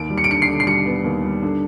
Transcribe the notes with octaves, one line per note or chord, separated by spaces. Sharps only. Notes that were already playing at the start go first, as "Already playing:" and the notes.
Already playing: D#2 D7
G3
C#7
D7
D3 C#7
C7
D3
C7
G3 C#7
B3
D#2
G3
D3